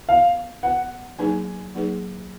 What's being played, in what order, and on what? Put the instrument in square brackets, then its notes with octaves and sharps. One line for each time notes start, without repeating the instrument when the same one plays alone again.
[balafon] B3 F#4 B4 [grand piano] F5
[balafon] B3 F#4 B4 [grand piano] F#5
[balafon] F#3 A#3 D#4 G#4 B4 [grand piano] G#5
[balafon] F#3 A#3 D#4 G#4 B4